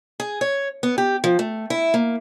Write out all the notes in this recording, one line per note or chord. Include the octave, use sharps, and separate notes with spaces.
G#4
C#5
B3
G4
F3
A3
E4
A#3